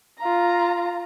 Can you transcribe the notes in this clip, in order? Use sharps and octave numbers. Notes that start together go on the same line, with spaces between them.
F4 A#5